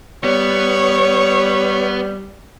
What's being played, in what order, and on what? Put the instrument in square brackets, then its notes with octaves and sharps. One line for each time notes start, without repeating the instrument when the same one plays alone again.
[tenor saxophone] G3 [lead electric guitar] B3 [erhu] C#5